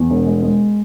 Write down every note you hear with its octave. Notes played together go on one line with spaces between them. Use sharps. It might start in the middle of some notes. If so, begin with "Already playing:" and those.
Already playing: E2
E1
G#3
G#3